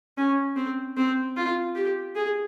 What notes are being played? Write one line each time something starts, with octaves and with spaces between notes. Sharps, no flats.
C#4
C4
C4
F4
G4
G#4